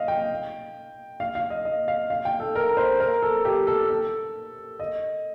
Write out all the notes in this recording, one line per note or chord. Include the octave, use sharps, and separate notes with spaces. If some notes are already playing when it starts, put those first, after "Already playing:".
Already playing: D#5 F5
G5
F5
F5
D#5
D#5
F5
F5
G5
A4
A#4
C5
A#4
A4
G4
A4
A4
D#5